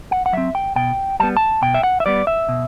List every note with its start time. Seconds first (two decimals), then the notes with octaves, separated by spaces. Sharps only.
0.11 F#5
0.26 F#5
0.33 F#3 C4 E5
0.55 G5
0.76 B2 G5
1.20 G3 A5
1.23 B3
1.37 A5
1.62 B2 G5
1.75 E5
1.83 F#5
2.00 E5
2.06 G3 B3 D5
2.27 E5
2.49 B2